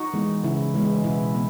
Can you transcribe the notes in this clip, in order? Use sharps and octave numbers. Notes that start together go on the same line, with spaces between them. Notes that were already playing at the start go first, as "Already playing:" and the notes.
Already playing: D#4 F#4
E3 G#3 B3
C#3 E4
E3 G#3 B3
B2 E4
B3